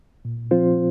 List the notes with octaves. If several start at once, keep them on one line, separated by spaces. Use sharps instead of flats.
A#2
F3 C4 F4 C5